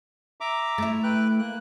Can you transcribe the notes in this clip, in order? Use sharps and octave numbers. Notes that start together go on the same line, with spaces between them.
E5 A#5 D6
A3 E4
B4 G5 F#6
A#3 F#6